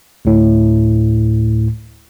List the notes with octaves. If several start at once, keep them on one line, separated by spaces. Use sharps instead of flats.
D2 A2